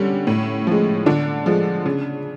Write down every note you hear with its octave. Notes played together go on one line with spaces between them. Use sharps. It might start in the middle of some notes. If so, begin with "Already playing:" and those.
Already playing: D3 G3 C#4
A2
F3 G#3
D3 D4
F3 G#3
C#3